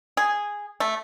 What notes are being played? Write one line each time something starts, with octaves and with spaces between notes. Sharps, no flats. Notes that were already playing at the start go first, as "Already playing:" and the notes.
G#4
A3